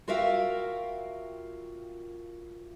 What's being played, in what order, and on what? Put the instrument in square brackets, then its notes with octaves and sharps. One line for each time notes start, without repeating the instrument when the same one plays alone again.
[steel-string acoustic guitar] F4 F#4 A#4 E5 F5 G5